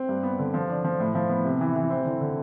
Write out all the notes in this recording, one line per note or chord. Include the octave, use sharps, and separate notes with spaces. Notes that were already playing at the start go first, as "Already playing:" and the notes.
Already playing: C4
G2
B3
D3
F3
D4
F3
A2
F3
B3
C3
E3
E3
C4
D3
D3